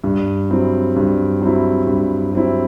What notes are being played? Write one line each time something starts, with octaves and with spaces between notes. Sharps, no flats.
G2
F#3 C4 E4
G2
F#3 C4 E4
G2
F#3 C4 E4